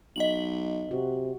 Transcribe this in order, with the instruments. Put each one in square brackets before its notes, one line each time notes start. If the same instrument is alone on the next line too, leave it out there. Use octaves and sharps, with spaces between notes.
[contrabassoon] B1 [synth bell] D#5 F#7
[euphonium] C3 [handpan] F#4